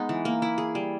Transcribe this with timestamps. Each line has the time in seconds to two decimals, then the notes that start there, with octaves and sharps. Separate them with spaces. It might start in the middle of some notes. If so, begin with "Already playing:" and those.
Already playing: G#3 B3 D#4
0.09 E3
0.25 A#3
0.42 E4
0.58 G#4
0.75 G3